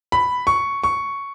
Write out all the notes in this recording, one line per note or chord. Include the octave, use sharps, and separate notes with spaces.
B5
C#6
C#6